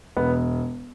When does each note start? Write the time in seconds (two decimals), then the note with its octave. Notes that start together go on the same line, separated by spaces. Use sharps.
0.17 E1 B3